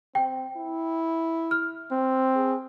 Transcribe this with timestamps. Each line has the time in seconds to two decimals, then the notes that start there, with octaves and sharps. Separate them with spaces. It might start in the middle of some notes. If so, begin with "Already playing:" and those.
0.15 C4 G5
0.56 E4
1.51 F6
1.92 C4
2.35 G#4